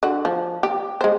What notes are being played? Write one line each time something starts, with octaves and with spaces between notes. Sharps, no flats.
D3 F#4
F3
G4
G#3 C5